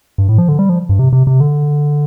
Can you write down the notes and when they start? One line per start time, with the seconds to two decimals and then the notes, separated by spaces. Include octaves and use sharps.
0.18 G2
0.29 A2
0.38 F3
0.48 D3
0.59 G3
0.69 F3
0.89 G2
0.99 C3
1.13 C3
1.27 C3
1.40 D3